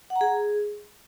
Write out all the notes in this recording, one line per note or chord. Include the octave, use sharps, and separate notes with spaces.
F#5
A#5
G#4